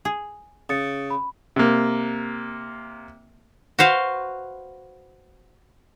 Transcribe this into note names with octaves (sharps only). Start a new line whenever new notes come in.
G#4
C#3 D#6 A6 C#7
B5
C3 A#3
F#4 B4 C5 F5